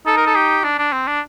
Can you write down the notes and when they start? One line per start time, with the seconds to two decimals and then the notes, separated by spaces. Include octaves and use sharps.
0.06 D#4 A4
0.17 A#4
0.27 A4
0.35 G4
0.64 D4
0.78 D4
0.92 C4
1.07 D4